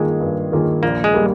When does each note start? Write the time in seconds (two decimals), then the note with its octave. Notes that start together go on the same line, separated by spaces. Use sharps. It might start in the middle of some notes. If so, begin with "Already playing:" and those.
Already playing: G2 D#3 G#3 A#3 F4 G#4
0.20 G2
0.52 D#3 A#3 F4 G#4
0.83 A#1 A#3
1.04 G#3
1.14 G3 A#3